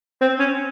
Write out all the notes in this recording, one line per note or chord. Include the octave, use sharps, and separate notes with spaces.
C4
C#4